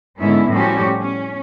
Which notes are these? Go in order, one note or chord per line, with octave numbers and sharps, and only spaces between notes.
G#2 D3 B3 C#4 E4
A2 F3 G3 C#4 F#4 G4
C#4